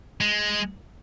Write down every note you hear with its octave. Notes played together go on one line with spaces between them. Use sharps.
G#3